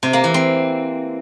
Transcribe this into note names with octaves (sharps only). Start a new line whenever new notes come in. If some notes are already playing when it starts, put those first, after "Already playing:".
C3
A#3
E3
C4